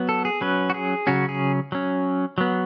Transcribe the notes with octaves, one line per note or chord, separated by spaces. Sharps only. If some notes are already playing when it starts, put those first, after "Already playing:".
Already playing: F#3 B3
A4
G#4
F#3 C#4 B4
F#4
G#4
C#3 F#3 C#4 F#4
G#4
F#3 C#4
F#3 B3